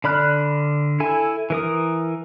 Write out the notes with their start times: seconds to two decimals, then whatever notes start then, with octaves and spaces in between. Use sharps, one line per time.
0.04 D3 D5 B5 F6 F#6
1.00 E4 A4 G#5
1.50 E3 A#4 D#6